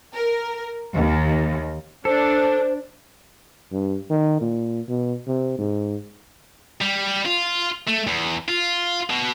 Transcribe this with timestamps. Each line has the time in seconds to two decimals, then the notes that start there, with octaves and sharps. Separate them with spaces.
0.14 A#4
0.93 D#2 D#3
2.05 D4 A4 C5
3.72 G2
4.10 D#3
4.41 A#2
4.89 B2
5.27 C3
5.59 G#2
6.82 G3
7.26 F4
7.87 A3
8.07 E2
8.49 F4
9.10 B2